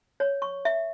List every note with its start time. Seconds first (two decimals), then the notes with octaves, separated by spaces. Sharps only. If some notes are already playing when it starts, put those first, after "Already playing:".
0.20 C#5
0.42 C#6
0.65 E5